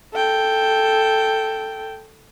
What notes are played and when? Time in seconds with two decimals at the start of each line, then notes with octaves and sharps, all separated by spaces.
0.14 A4 G5